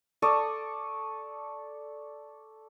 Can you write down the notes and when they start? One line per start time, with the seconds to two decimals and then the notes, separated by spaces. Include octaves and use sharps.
0.22 A4 D5 C#6 D#6